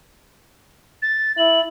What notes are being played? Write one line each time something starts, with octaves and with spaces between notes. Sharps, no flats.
A6
E4 F#7